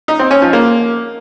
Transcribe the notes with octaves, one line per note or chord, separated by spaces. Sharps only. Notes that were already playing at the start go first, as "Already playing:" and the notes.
D#4
C4
C#4
F3
A#3